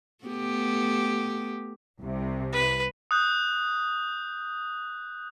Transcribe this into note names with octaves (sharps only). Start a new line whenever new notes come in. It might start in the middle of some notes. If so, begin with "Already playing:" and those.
A3 B3 G4
C2 C3
B4
D#6 F#6 G6